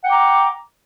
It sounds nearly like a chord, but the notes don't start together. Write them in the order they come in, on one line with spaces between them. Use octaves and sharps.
F#5 G5 D6 A#5